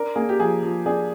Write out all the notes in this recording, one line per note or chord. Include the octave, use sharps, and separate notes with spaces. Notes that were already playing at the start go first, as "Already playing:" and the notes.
Already playing: D4 A#4
A#3 G#4
G4
F3 G#4
F3
D4 G#4